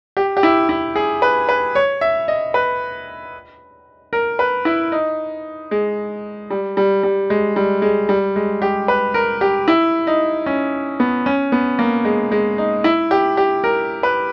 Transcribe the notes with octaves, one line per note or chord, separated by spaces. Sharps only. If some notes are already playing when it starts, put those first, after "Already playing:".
G4
G4
E4
E4
G#4
B4
B4
C#5
E5
D#5
B4
A#4
B4
E4
D#4
G#3
G3
G3
G3
G#3
G3
G#3
G3
G#3
G4
B4
A#4
G4
E4
D#4
C#4
B3
C#4
B3
A#3
G#3
G#3
D#4
E4
G4
G4
A#4
B4